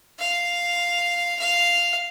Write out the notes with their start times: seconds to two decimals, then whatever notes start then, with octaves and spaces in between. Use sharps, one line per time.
0.19 F5
1.39 F5